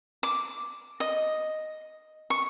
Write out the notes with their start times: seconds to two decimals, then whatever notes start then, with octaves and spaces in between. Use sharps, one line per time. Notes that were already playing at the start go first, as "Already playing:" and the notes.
0.23 D6
1.00 D#5
2.30 C#6